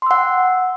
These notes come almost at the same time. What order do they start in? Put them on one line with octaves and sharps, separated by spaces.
C6 E6 F#5 G5